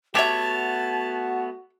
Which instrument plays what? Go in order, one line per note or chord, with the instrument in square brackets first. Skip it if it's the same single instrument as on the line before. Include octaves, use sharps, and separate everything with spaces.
[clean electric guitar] A3 B3 C#5 [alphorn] F#4 [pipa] G4 E5 [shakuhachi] A5